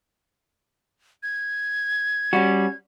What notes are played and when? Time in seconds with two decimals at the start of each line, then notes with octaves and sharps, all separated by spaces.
1.23 G#6
2.33 G3 C#4 F#4